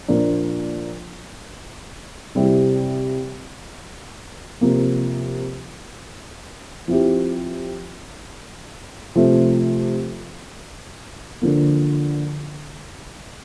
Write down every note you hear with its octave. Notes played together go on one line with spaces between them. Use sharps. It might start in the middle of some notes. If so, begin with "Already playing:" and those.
A#2 F3 A#3 D4
C3 G3 C4 E4 G4
C3 F3 A#3
F3 C4 E4 G4
C3 F3 A3
D3 F3 A#3